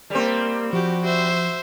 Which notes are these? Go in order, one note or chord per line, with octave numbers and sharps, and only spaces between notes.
G3 A#3 C4
F3 F#4 G4
C5 E5